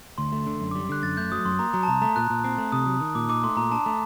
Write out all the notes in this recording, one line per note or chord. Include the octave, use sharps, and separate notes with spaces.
D2 C6
A3
D3
F#2
G3 D6
D3 F#6
F#2 A6
A3 G6
F#3 D#6
F#2 C6
A#3 A#5
F#3 A#5
A5
C2 A#5
A3 A#5
A#2 F#6
A#2
C4
A3
C3 D#6
F#3
D#3
A#2 D6
D#4 D6
A3 C6
A#2 A#5
D4 A5
A3 A#5